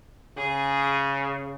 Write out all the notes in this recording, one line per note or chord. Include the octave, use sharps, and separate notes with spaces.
C#3 G#4